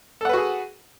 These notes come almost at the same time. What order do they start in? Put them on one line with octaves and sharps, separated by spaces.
A4 F#5 B4 F#4 G#4